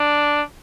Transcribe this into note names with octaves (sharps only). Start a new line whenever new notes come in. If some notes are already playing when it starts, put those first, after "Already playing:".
Already playing: D4